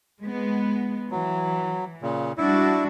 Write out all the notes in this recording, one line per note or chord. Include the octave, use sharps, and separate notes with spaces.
G#3 B3
E3 F#3
A#2 C#3
G3 D4 E4 F#4